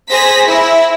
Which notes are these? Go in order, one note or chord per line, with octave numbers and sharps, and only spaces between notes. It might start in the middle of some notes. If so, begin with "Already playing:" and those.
G#4 C5 A#6 B6
E4